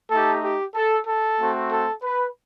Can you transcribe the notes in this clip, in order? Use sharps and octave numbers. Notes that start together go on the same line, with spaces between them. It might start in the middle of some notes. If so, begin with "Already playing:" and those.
A3 D#4 G4 A4
G4
A4
A4
A3 C4 F#4
A4
B4